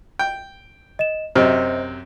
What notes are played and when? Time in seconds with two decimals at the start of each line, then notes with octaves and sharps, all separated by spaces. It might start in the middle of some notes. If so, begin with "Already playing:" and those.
0.19 G5
0.99 D#5 E7
1.36 F#2 C3 C5 D#5